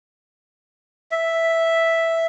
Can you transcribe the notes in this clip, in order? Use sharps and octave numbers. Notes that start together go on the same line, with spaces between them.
E5